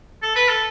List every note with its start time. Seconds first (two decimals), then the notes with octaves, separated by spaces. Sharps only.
0.22 A4
0.35 B4
0.48 A4